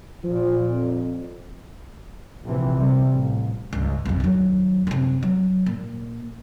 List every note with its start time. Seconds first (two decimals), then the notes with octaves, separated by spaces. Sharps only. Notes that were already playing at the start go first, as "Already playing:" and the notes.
0.24 A#2 F3
0.69 F2
2.45 A#1 C3 E3
2.78 C3 G3
3.11 A1
3.73 C#2 G2
4.05 B1 F2
4.20 D#2 F#3
4.87 F#2 C3
5.23 F#3
5.66 A#2